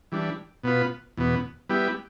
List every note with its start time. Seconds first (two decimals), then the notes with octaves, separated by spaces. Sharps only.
0.12 E3 G3 D4
0.64 B2 B3 F4 B4
1.17 E2 B2 B3
1.69 G3 B3 E4 G4